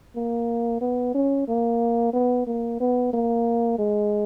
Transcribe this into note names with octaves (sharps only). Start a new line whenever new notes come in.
A#3
B3
C#4
A#3
B3
A#3
B3
A#3
G#3